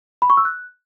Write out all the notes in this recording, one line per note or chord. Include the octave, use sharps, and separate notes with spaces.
B5
C#6
E6
F#6